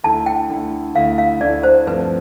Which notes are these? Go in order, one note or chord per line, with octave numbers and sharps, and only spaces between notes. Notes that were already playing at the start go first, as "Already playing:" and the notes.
D2 D3 A3 E4 A5
G5
D2 D3 A3 E4
D2 D3 A3 E4 F5
F5
D2 D3 A3 E4 D5
C5
G2 F3 A3 C4 B4